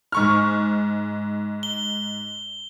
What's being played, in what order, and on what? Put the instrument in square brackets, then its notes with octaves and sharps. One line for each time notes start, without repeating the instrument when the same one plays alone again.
[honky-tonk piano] G#2 C#6 F6
[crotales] G7